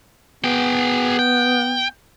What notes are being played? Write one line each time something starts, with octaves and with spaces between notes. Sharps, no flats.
B3 G#4 G5
G5